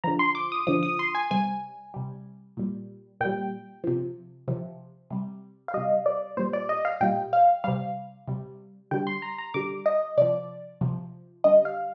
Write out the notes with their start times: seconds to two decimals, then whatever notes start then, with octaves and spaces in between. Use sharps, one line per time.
0.04 D3 F3 A#5
0.19 C6
0.35 D6
0.52 D#6
0.67 D3 F3 D#6
0.83 D#6
0.99 C6
1.15 G#5
1.31 C3 G3 G#5
1.94 C3 G3
2.57 A#2 G3
3.21 A#2 G3 G5
3.84 C3 F3
4.48 C3 F3
5.11 C3 G3
5.68 F5
5.74 C3 G3 D#5
6.06 D5
6.37 A#2 G3 C5
6.53 D5
6.69 D#5
6.85 F5
7.01 A#2 G3 G5
7.33 F5
7.64 C3 G3 F5
8.28 C3 G3
8.91 D3 G3 G5
9.07 C6
9.22 A#5
9.38 A#5
9.54 D3 G3 D6
9.86 D#5
10.17 C3 F3 D5
10.81 C3 F3
11.44 D3 G3 D#5
11.65 F5